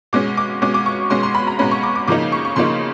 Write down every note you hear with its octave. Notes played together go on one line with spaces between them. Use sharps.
B2 G#3 C#4 D6
D6
B2 G#3 C#4 D6
D6
C#6
B2 G#3 C#4 C6
C6
B5
A#5
B2 G#3 C#4 B5
C#6
D6
D6
C#3 F3 A#3 D#4 D6
C#6
C#6
C#3 F3 A#3 D#4 C6